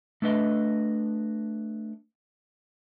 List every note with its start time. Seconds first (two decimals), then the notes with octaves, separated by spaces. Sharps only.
0.22 A3 D4 B4 D#5